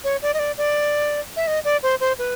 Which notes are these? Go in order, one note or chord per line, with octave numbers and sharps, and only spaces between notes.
C#5
D5
D#5
D5
D5
E5
D#5
D5
C5
C5
B4